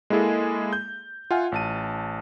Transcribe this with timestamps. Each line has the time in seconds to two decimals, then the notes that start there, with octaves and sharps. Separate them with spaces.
0.10 G#3 A#3 E4 G#4 A4
0.73 G6
1.31 F4 E5 F#5 G#5 F6
1.52 A1 A5 D#7